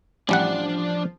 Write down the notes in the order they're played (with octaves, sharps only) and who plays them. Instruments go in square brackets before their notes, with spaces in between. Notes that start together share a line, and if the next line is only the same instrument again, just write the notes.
[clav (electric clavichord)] A1 G3 F#5 [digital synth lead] F3 [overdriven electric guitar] D4 D5